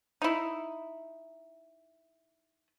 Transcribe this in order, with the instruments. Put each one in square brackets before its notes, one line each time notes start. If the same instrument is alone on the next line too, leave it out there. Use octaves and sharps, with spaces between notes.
[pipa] D#4 E4